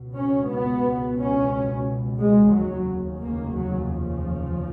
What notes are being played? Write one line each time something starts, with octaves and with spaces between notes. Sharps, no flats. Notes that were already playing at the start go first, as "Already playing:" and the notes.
Already playing: C#2 B2
C#4
B3
C#4
G#3
F1 D#2 C#3 F#3
A#3
F#3
F3